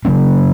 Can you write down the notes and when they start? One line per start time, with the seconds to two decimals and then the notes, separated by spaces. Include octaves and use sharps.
0.05 C#3 F#3 A#3 C#4